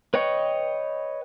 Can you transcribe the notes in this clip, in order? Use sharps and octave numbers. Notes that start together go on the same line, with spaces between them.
B4 C#5 D#5 G5 C#6